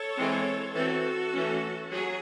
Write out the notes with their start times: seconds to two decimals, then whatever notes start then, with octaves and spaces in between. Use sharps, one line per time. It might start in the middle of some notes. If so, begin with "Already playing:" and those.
Already playing: A4 C#5
0.17 E3 G#3 C4
0.74 E3 C4 F#4 A4
1.33 E3 A3 C#4
1.91 F#3 G#4